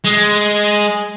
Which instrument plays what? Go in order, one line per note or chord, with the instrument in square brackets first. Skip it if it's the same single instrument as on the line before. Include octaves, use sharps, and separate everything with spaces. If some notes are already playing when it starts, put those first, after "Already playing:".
[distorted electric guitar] G#3